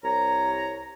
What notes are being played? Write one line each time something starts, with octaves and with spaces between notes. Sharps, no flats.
C2 C#5 A#5